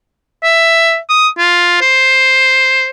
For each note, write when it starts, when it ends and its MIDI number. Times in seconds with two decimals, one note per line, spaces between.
0.44 0.97 76
1.10 1.28 87
1.38 1.78 65
1.81 2.89 72